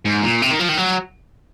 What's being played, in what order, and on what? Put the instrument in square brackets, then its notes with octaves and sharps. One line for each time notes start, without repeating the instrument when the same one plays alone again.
[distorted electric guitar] G#2
A#2
C3
D#3
F3
D#3
F#3